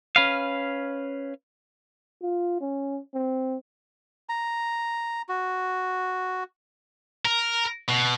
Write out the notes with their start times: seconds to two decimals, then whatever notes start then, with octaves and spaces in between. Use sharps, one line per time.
0.16 C#4 B4 F5
2.22 F4
2.61 C#4
3.14 C4
4.29 A#5
5.29 F#4
7.25 A#4
7.88 B2